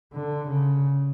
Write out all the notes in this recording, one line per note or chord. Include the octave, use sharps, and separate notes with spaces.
D3
C#3